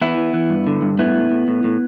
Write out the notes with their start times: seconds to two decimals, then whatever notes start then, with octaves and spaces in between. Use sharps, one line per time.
0.01 E3 B3 E4
0.18 E3
0.34 E3
0.50 G2
0.67 D3
0.82 G2
0.99 A2 B3 E4
1.16 A2
1.31 A2
1.48 A2
1.64 A2